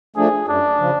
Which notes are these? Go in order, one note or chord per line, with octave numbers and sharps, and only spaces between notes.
F3 A3 D4 G#4
F#2 D4
C#3 F3